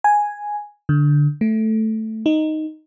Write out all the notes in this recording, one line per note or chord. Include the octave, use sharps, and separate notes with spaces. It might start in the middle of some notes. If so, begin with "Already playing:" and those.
G#5
D3
A3
D#4